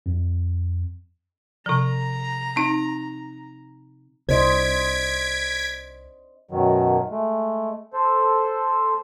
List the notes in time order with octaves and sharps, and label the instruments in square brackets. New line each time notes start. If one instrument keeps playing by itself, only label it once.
[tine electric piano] F2
[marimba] C3 F3 [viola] A#5
[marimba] C4 D#4
[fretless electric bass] C2 [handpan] C5 D5 D#5 [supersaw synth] G#6 B6 D7
[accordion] F#2 B2 D#3 F#3
G#3 A3
A4 C5